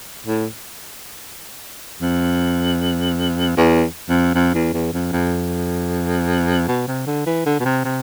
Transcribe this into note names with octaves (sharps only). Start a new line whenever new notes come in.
A2
F2
E2
F2
F2
E2
E2
F2
F2
B2
C3
D3
E3
D3
B2
C3
C3